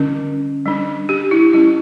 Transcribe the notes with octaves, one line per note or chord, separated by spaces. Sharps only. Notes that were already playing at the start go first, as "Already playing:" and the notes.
Already playing: D3 G3 C#4
G3 D4
G4
E4
G3 C#4 E4